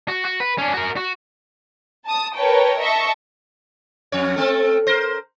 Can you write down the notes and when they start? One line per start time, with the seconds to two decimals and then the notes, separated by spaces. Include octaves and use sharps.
0.08 F#4
0.25 F#4
0.40 B4
0.58 C#4 D4
0.74 F#4 A#4
0.97 F#4
2.05 A5 D#6
2.35 A#4 B4 C#5 G5 A5
2.80 D#5 E5 A5 C#6
4.12 F2 C#5
4.36 A3 C4 A4
4.87 A#4 C5